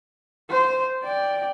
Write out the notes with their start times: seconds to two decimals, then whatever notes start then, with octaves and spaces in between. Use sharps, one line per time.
0.50 C5
1.03 D5 G5